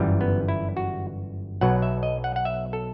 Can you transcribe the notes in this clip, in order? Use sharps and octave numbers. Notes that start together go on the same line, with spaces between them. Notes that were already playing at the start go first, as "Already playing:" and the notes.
Already playing: G1 F#2 E3 G3
B3
E4
F#4
B1 B2 F#3 F#5
E5
D#5
F#5
F#5
E5
A4